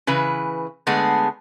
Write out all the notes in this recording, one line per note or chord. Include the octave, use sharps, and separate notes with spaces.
C#3 E3 B4
D3 G#3 A3 B3 G#4